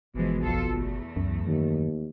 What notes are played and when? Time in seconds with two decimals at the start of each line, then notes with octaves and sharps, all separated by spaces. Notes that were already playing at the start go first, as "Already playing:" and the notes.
0.15 G1 B2 E3 F3 G#3
0.43 B1 F2 F4 A4
0.72 E2 A3
1.17 C#2 F#2
1.47 D#2 D#3